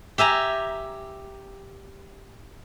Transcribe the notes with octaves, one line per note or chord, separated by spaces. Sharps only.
G4 E5 G#5 A#5